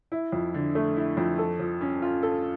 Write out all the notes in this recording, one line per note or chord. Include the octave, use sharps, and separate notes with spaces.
E4
F2
D3
A3
E4
F2
A4
F3
C#4
F4
A4